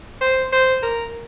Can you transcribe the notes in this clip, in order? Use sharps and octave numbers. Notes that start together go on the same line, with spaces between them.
C5
C5
A#4